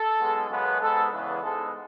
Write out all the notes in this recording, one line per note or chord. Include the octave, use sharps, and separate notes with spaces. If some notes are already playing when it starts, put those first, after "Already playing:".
Already playing: A4
B1 B2 G#3
F#2 C#3 G#3 B3
G#2 G#3 B3 A4
E2 C#3 E3 G#3 B3 B4
G#2 G#3 B3 A4